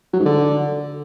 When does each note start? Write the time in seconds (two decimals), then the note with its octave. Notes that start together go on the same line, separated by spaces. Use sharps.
0.13 F#3
0.19 G#2
0.26 D3